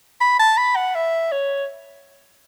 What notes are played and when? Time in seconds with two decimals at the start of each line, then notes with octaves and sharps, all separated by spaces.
0.21 B5
0.39 A5
0.58 B5
0.76 F#5
0.95 E5
1.32 C#5